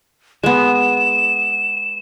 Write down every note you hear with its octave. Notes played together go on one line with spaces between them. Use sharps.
G#3 B3 E7